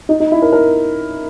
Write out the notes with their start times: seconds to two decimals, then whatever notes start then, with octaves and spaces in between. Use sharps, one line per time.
0.09 D#4
0.20 D#4
0.32 E4
0.42 A#4
0.52 A#4